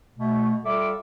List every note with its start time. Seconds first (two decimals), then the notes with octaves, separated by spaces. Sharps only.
0.18 B2 A3
0.64 G3 F4 A4 E5 D6